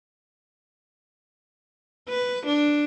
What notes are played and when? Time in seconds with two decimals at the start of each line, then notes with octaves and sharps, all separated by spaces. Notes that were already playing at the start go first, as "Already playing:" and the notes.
2.09 B4
2.47 D4